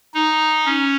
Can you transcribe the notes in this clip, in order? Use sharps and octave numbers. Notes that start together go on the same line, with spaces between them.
D#4
C#4